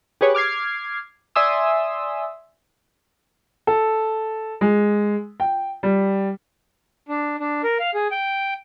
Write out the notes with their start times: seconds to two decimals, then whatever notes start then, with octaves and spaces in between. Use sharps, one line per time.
0.21 G4 G#4 B4 C#5
0.35 D6 F6 G#6 C7
1.36 D5 E5 G#5 C6 D#6 E6
3.67 A4
4.61 G#3
5.40 G5
5.83 G3
7.09 D4
7.40 D4
7.63 A#4
7.80 F5
7.94 G#4
8.11 G5